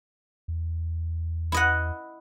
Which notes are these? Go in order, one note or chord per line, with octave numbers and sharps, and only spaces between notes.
E2
E4 D#5 F#5